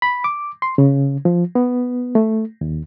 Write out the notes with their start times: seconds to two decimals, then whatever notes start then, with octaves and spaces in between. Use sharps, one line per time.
0.02 B5
0.24 D6
0.62 C6
0.78 C#3
1.25 F3
1.55 B3
2.15 A3
2.61 D#2